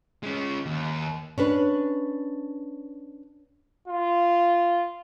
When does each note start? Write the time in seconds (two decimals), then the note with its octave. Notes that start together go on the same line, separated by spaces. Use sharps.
0.23 G#3 C#4
0.66 D#2
1.38 C#4 D4 B4
3.88 F4